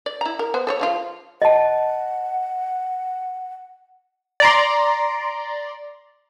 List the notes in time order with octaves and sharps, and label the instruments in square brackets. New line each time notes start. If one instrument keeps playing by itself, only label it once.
[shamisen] D5
E4 A#5
A#4
B3 C5
A4 C5 C#5
C#3 F3 F4
[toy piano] D#5 A5 [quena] F#5
[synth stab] D5 A#5 C6